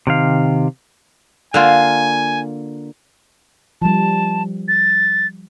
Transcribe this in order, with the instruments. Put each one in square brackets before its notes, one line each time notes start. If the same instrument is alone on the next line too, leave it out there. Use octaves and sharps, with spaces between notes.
[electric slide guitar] C3 D#3 F5
[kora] D3 A#3 F4 [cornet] G#5
[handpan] F3 G3 [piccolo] A5
[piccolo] A6